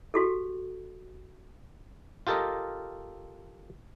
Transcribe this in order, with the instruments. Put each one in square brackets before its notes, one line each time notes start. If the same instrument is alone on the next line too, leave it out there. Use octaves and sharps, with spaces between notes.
[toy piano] F#4 G4 A4
[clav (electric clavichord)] F4 G4 A4 A#4 D#5